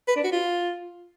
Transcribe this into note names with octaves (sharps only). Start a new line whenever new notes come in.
B4
D4
F#4
F4